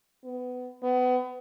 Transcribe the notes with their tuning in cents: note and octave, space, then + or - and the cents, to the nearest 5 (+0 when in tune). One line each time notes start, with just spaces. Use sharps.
B3 +20
B3 +30